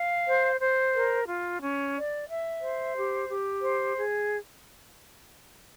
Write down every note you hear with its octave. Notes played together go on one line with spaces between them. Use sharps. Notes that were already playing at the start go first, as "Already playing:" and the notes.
Already playing: F5
C5
C5
A#4
F4
C#4
D5
E5
C5
G4
G4
C5
G#4